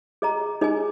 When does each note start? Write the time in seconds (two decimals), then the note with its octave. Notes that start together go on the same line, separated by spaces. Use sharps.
0.22 G#4 D#5 A#5
0.61 D#4 G#4 D#5 G#5